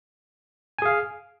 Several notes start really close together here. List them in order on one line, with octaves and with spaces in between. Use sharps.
G#5 G#4 F5